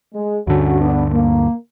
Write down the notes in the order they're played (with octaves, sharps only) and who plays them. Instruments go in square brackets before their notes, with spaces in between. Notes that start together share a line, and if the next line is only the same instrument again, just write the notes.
[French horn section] G#3
[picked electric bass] D2 G2 D3 [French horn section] C#4 F#4
[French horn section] B3 D4
A#3